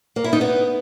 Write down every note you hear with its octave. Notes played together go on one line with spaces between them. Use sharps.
A#3
E4
D#4
B3